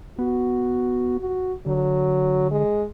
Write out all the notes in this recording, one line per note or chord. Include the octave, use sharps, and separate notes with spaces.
B3 F#4
F#4
D3 F#3
G#3